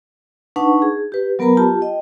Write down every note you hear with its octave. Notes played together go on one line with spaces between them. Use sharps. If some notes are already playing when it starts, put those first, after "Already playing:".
D4 D#4 B4 F#5 A5 C#6
G#4
G4 B4
F#3 B3 A#4 B4 A#5 B5
F4 G4 A5
D#5 G5